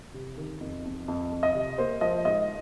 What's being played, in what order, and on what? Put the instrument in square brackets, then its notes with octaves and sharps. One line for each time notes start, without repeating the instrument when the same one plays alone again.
[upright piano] C3
D#3
F2
F2
F2
F2
D#5
C3
A#3 C5
F3 D#5
G#2 D#5